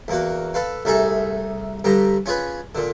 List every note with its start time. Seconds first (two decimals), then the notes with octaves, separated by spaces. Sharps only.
0.08 E2 A#3 F#4
0.54 A4 B4 F5
0.85 C2 A3 D#4 G#4 A4
1.84 G2 D3 G3 A#5
2.26 C#4 F4 G#4 B4
2.75 A#2 D3